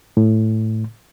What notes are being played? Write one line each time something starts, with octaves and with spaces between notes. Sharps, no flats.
A2